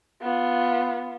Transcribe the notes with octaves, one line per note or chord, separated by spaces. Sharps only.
B3 F4